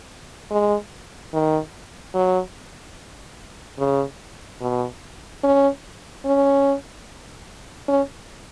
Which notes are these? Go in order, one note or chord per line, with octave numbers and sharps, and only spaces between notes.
G#3
D#3
F#3
C#3
B2
C#4
C#4
C#4